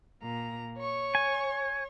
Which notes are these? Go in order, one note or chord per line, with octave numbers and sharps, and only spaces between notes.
A#2 A#5
C#5 C#6
G#5